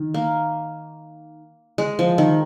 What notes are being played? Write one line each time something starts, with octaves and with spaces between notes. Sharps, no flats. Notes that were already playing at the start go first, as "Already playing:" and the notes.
Already playing: D#3
A#3
G#3
F3
D#3